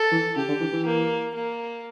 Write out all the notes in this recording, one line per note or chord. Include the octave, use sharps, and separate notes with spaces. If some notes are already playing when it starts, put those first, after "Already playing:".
Already playing: A4
E3
C#3 G4
D3
E3
E3
A#3
A#3